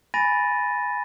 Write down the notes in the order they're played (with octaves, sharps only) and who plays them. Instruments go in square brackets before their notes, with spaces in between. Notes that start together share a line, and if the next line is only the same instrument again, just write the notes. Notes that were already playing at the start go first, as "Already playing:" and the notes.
[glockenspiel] G#5 B5 A6 A#6 D#7